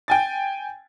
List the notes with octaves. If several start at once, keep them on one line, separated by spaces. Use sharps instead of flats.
G5 G#5 A6